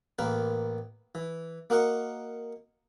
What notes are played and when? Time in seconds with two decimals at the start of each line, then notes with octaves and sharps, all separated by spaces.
0.19 A1 A#3 A#4 B4
1.15 E3
1.70 A#3 F#4 A#4 D#5 F#5 C#6